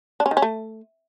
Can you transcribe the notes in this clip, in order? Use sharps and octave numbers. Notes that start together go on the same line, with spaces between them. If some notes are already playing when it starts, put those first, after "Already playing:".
D4
C#4
D#3
C#4
A3